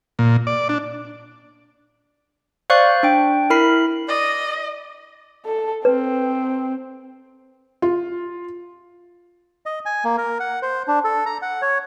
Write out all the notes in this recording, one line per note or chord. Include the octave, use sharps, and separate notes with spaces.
A#2
D5
D4
C5 D5 F5 C#6 F#6 G6
D4 G5
E4 A#4 B5 C7
D5 D#5
A4
C4 B4
F4
D#5
G#5
A#3
A#4
F#5
C5
D4
A4
A#5
F#5
C#5